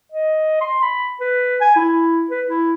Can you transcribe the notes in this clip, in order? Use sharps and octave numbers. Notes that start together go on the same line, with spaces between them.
D#5
C6
B5
B4
G#5
E4
B4
E4